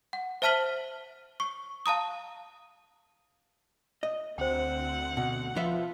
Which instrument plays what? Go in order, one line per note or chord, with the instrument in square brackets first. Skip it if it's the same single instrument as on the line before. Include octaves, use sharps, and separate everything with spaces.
[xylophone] F#5
C5 E5 A5 F6 B6 F#7
C#6
F5 A5 A#5 D#6
[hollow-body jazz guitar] D#5
[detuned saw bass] D2 [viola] C4 F#5 [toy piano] C5 G5
[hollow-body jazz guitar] B2
[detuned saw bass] F3 [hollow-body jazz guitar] F4 B4 E5